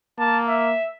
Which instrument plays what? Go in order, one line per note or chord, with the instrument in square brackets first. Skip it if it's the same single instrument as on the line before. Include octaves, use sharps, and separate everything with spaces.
[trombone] A#3 [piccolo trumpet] A5
[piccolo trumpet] E5